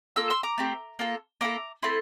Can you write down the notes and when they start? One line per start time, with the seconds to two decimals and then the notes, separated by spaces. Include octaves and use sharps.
0.16 A#3 F4 A4 E6
0.30 C6 E6
0.43 A#5 D6
0.58 A3 C4 G4
0.99 A#3 F4 A4
1.41 A#3 E4 A4 A#5 D6
1.82 A3 C4 E4 A5 C6